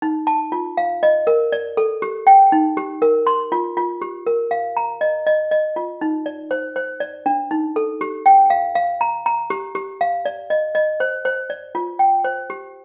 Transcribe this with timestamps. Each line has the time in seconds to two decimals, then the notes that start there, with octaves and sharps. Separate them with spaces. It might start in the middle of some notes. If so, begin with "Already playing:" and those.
0.02 D#4
0.27 A5
0.52 F4
0.77 F5
1.03 D#5
1.27 A#4
1.52 D5
1.77 A4
2.02 G4
2.27 G5
2.52 D#4
2.77 G4
3.02 A#4
3.27 C6
3.52 F4
3.77 F4
4.02 G4
4.27 A#4
4.51 F5
4.77 A#5
5.01 D#5
5.27 D#5
5.51 D#5
5.76 F4
6.01 D#4
6.26 D5
6.51 C5
6.76 C5
7.00 D5
7.26 D4
7.51 D#4
7.76 A4
8.01 G4
8.26 G5
8.50 F5
8.75 F5
9.01 A#5
9.26 A#5
9.50 G4
9.75 G4
10.01 F5
10.25 D5
10.50 D#5
10.75 D#5
11.00 C5
11.25 C5
11.50 D5
11.75 F4
11.99 G5
12.24 C5
12.50 G4